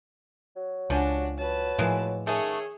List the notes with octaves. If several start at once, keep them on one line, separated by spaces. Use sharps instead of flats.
F#3
C#2 F3 C#4 D4 F#4
F#3 B4 A5
A2 E3 F3 G#3 A#3
D#3 A3 C#4 G#4 C#5